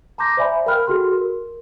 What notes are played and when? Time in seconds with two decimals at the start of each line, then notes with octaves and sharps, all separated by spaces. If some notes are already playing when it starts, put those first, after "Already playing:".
0.18 A5 A#5 C6 D6 G6 A#6
0.37 C5 D5 E5 G#5 B5
0.66 A#4 F5 G5 B5 F6 F#6
0.86 F#4 G#4 A4 C6 F6
1.12 A#4